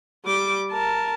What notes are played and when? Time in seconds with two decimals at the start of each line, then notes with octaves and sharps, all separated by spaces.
0.25 G3 D6
0.71 A#4 A5